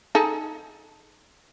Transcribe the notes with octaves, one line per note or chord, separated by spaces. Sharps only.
D#4 G#4 A4